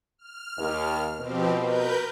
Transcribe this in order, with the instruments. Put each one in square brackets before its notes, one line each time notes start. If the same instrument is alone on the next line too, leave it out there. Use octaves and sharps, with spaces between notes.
[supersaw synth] F6
[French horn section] D#2
[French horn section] B2 [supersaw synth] F3 C4 G4
[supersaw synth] A#4 B4 G6